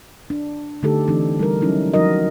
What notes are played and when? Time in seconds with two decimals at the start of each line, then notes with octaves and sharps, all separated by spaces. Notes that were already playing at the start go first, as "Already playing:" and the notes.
0.30 D4
0.83 D3 A3 D#4 G4 A4
1.08 E3 A3 C4 D4 D#4
1.39 G3 D#4 A#4
1.61 F#3 C#4 D#4 E4
1.93 F3 F#3 D#4 F#4 A#4 D#5